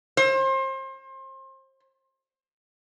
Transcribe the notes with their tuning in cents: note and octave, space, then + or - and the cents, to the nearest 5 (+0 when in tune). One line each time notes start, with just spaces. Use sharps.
C5 +30